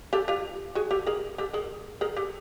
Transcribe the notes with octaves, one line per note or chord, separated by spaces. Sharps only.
G4 A4
F4 G4
F#4 G#4
G4 A4
G#4 A#4
G4 A4
G#4 A#4
G#4 A#4
G4 A4